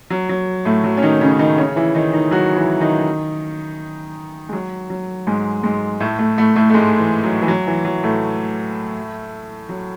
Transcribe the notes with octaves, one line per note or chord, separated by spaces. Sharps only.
F#3
F#3
A2 A3
F#3
C#4
D#3 D#4
C#3 C#4
D#3 D#4
C#3 C#4
E3 E4
D#3 D#4
D#3 D#4
F#3 F#4
E3 E4
D#3 D#4
G#3
F#3
F#3
G#2 G#3
G#2 G#3
A2 A3
A2 A3
A2 A3
A2 A3
A3
G#2 G#3
E3
F#3
E3
F#3
E3
F#3
A2 A3
F#3